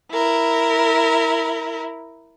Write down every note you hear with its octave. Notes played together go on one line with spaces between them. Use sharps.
E4 A#4